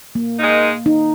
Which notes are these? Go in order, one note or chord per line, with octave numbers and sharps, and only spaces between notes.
A#3
G#2 D#3 G#3 D#4
D#4